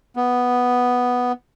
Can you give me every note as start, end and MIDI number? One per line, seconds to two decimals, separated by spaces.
0.16 1.32 59